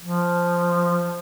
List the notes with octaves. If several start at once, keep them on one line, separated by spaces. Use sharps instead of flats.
F3